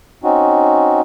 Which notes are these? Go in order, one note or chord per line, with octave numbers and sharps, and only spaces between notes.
C4 C#4 D#4 F#4